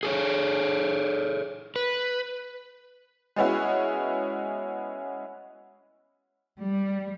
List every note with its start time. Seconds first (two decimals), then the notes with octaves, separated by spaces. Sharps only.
0.03 G#4 A4 C#5
1.76 B4
3.36 G#3 B3 C#4 E4 F#4
6.62 G3